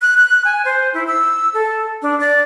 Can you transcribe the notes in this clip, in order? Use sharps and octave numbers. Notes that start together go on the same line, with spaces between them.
F#6
F#6
G#5
C5
E4
E6
A4
D4
D5